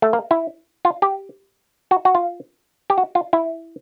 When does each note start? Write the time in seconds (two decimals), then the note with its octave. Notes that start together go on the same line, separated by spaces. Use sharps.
0.02 A3
0.13 A#3
0.31 E4
0.85 F4
1.02 G4
1.91 F#4
2.05 F#4
2.15 F4
2.90 G4
2.98 F#4
3.15 F4
3.33 E4